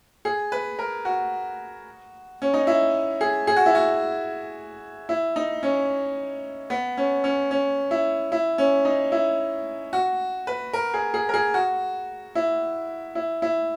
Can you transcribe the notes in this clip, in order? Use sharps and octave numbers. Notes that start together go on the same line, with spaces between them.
G#4
B4
A#4
F#4
C#4
D#4
E4
G#4
G#4
F#4
E4
F#4
E4
D#4
C#4
B3
C#4
C#4
C#4
E4
E4
C#4
D#4
E4
F#4
B4
A#4
G#4
G#4
A#4
G#4
F#4
E4
E4
E4